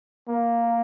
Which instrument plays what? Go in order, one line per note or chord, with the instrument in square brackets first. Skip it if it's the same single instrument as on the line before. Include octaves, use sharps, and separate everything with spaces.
[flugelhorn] A#3